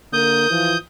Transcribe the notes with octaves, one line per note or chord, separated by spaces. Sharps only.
D3 A#3 A#4 D#6 G6
E3 F3 F4